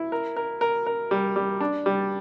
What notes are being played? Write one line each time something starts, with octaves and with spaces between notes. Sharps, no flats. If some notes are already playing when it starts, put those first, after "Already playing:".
Already playing: E4
A#4
A#4
A#4
A#4
G3
G3
D4
G3